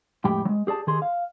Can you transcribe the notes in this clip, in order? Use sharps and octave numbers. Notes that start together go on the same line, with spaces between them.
F2 A2 G#3 G4 G5 B5
F#3 G#3
G4 G#4 D5 A5
D#3 G4 G#4 C6
F5